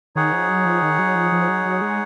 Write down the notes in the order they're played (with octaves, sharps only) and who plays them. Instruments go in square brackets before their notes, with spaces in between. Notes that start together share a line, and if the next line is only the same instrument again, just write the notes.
[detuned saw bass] D#3 [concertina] D#4 G#4 C#5 F#5
[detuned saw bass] F3
F#3
F3
D#3
F#3
F3
F3
F#3
F#3
G#3